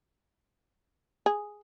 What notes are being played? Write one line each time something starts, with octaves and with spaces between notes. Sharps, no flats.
G#4